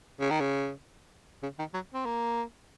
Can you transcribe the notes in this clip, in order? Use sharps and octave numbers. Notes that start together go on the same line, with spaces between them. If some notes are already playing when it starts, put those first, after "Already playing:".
C#3
D#3
C#3
C#3
D#3
F#3
C4
A#3